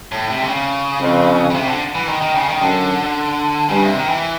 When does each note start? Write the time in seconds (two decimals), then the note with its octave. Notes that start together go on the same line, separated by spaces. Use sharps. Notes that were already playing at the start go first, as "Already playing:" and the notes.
0.12 A2
0.29 C3
0.41 D3
0.47 C#3
1.01 F2
1.50 C#3
1.54 C3
1.68 D3
1.95 E3
2.08 D#3
2.22 D#3
2.35 C#3
2.49 D#3
2.61 F#2 D3
3.69 G2 C#3
3.83 C3
3.96 D#3
4.09 E3